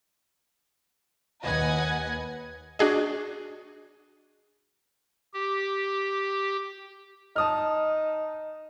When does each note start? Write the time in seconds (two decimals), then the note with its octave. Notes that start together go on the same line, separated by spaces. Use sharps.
1.43 D#2 B4 D#5 F#5 G#5 G#6
2.79 D4 F#4 G#4 D#5
5.33 G4
7.36 D#4 A5 D#6 F6